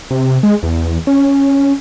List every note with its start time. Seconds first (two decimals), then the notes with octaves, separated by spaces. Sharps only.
0.11 C3
0.43 G#3
0.63 E2
1.07 C#4